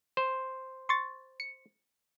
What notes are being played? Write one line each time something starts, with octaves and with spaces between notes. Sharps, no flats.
C5
C6 C#6 A6
C#7